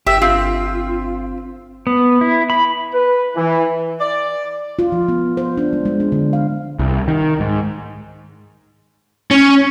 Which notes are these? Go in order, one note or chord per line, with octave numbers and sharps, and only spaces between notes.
G1 G4 E5
C4 F4
B3
E4
B5
B4
E3
D5
F4
F3
B3
C5
D4
G#3
G#3
D4
D3
F5
C2
D#3
G#2
C#4